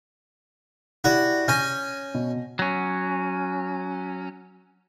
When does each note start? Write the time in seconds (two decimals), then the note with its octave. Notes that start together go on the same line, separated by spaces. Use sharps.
1.04 E4 F#4 G4 D5
1.48 C#4 G#5 G6 A#6
2.14 B2
2.59 F#3 C#4